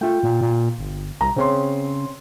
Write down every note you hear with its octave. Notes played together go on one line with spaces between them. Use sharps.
A3 F4 G5
A#2
A#2
G1
C2 A#5
C#3 C4 C#5 C6